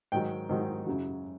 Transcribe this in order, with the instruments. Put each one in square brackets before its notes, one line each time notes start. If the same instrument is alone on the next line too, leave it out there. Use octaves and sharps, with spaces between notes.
[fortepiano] G#2 D#3 F#3 G5
G#2 D#3 F#3
F#2 C#3 F#3